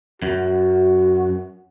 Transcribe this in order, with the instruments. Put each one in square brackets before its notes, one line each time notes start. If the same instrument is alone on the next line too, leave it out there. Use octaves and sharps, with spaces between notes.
[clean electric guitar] F#2 [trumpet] F#4